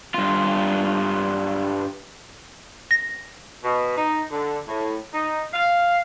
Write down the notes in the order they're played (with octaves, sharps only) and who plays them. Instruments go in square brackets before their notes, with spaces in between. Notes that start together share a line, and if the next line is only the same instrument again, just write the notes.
[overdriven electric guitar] G2 F4
[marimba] A#6
[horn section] B2
D#4
D3
A2
D#4
F5